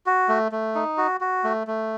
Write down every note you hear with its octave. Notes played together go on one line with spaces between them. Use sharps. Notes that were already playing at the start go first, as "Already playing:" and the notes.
F#4
A3
A3
D#4
F#4
F#4
A3
A3